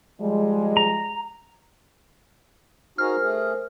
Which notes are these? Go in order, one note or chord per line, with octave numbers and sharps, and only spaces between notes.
F3 G3 G#3
A#5
D#4 F#4 G#4 A#4 C5 F6
A3 G#4